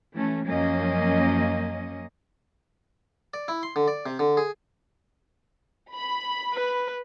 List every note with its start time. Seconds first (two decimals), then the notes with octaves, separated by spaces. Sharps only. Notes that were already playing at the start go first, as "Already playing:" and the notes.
0.14 E3 A3 C#4
0.46 F#2 F3 A#3 C#4 D#5
3.34 D5
3.48 E4
3.63 C6
3.76 D3
3.88 D5
4.06 C3
4.19 D3
4.37 G#4
5.94 B5
6.54 B4